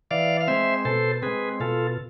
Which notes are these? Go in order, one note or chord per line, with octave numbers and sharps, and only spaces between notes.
E3 D5 F5
F5
G#3 C4 C5 E5
B2 A4 C5
G#3 C4 G#4 B4
B2 F4 A4